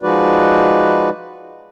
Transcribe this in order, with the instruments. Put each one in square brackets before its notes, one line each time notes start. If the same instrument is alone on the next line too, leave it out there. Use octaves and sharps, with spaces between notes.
[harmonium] F3 G#3 D#4 F#4 B4 D5